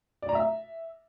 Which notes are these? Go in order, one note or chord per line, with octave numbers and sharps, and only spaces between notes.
D5
A#5
E5